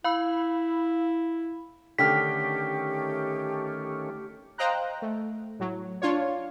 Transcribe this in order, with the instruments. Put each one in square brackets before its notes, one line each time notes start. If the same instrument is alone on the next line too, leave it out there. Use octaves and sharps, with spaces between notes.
[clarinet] E4 [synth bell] F5 B5 E6
[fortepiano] D3 G5 F6 [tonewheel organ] D#3 A3 C#4 [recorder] G4 [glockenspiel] B6
[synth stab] C5 D#5 F5 G5 A#5 F#6
A3
A2 F#3
D4 F4 C#5